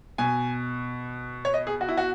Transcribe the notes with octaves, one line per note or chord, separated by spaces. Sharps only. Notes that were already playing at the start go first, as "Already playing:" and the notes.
B2 G#5
C#5
D#5
G#4
F#4
E4
F#4